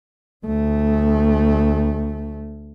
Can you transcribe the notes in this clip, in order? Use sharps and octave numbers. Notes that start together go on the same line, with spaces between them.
D2 A3